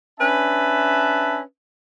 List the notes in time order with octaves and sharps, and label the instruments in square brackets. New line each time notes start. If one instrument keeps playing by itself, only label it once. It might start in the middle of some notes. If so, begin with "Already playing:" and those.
[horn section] C#4 D4 B4 E5 A5